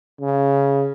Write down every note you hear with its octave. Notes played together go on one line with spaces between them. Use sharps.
C#3